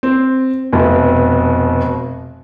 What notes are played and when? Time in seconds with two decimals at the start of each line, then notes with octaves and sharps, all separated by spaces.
0.03 C4
0.73 F1 B2